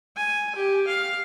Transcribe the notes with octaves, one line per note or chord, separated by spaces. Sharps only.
G#5
G4
F5